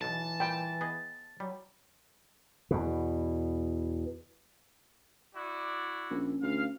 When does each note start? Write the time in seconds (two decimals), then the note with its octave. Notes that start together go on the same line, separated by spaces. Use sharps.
0.01 B1 B2 E3 A5
0.40 A#2 G3 G5
0.81 B3 G#4 D#5
1.40 F#3 G3
2.71 E2 B2
5.35 E4 F#4 D5
6.11 A#1 C#4
6.42 D2 F5